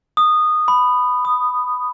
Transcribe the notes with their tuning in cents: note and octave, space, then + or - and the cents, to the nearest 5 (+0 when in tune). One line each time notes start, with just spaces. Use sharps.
D#6 -15
B5 +10
D#6 -5